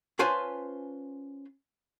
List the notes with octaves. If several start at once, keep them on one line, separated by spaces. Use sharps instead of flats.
C#4 F4 B4 C5 G#5 A5